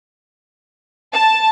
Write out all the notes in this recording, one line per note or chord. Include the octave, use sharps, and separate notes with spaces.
A5